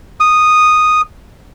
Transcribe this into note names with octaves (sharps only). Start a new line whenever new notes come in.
D#6